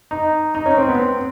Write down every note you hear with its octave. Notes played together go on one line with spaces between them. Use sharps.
D#4
D#4
C#4
C4
B3
C4